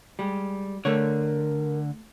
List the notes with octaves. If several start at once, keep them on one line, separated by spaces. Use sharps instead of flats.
G3 G#3
D3 A3 A#4 C#5